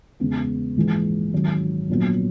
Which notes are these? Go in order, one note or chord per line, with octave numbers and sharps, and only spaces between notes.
E2 C#3 G#3 B3
A#1 G#2 E3 G#3
G#1 G#2 D#3 F#3
A#1 A#2 F#3 B3